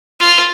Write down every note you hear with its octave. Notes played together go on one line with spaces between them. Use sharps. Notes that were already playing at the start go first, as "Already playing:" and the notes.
F4